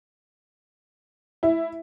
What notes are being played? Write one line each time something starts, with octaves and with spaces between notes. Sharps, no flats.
E4